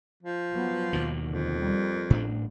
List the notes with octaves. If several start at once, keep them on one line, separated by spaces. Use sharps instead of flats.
F3
F#3 B3
D#2 B2 D#3
F2 D3
G3 A#3
A1 A2 D4